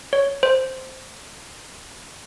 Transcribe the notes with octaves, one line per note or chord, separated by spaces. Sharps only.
C#5
C5